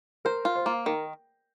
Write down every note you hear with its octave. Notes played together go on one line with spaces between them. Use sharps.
A#4 C5
F4
C5
A#3
D#3 A#4